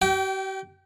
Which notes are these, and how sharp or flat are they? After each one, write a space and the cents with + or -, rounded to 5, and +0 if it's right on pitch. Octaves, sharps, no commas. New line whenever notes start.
G4 -45 G5 -20